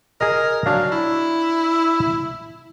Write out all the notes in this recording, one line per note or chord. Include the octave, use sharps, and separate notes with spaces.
G#4 A#4 D#5
F#3 D4 F5
E4